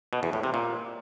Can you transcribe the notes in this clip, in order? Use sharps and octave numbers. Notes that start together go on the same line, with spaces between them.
B2
E2
A2
C3
A#2